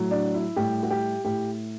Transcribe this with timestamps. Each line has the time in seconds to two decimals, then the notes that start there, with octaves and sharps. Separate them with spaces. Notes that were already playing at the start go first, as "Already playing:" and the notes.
Already playing: A2 F#3
0.11 D4
0.34 E4
0.56 A2 G3 G4
0.83 F#4
0.90 G4
1.25 A2 G4